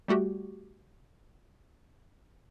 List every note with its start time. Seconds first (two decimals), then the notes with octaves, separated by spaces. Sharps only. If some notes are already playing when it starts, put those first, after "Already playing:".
0.08 G3 A3 F#4 G4